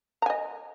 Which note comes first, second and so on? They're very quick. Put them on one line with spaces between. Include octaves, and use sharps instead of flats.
A#5 G#5 D#5